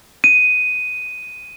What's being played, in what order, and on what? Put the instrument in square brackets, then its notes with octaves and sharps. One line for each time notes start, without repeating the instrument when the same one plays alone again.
[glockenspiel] D#7